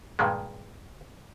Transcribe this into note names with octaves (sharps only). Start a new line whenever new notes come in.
G2 A#2 D#3 G#3